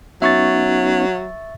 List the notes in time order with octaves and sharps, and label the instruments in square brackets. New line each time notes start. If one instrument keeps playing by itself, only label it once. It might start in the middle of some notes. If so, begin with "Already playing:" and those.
[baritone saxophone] F#3 [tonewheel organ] B3 C#4 D#4 [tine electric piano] E5 C#6 A6